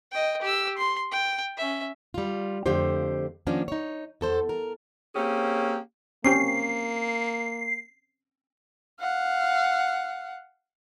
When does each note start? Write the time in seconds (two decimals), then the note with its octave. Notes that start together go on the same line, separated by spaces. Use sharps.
0.12 D#5 G5
0.42 G4 E6
0.77 C6
1.11 G5
1.57 C#4 E5
2.14 G3 F4
2.66 F2 D3 F3 A3 G4 C5
3.47 D#3 F3 A#3 C#4 D4
3.68 D#4 C#5
4.21 E2 A4 C5
4.49 A#4
5.15 A#3 C4 C#4 G4 G#4
6.24 A#3 C4 C#4 G4 C7
9.00 F5 F#5